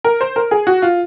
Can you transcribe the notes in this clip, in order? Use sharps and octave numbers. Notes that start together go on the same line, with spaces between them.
A#4
C5
A#4
G#4
F#4
F4